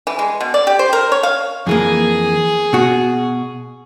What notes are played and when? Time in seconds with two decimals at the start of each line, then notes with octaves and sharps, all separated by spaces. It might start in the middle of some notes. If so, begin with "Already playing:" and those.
0.07 E3
0.19 G#3
0.40 B2
0.54 D5
0.67 G4
0.79 C5
0.93 A#4
1.12 C#5
1.23 F5
1.67 F2 E3 A#3 G#4
2.73 B2 F#4